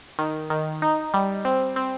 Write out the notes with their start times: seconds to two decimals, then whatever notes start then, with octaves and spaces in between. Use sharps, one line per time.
0.19 D#3
0.50 D#3
0.82 D#4
1.14 G3
1.45 C4
1.76 C4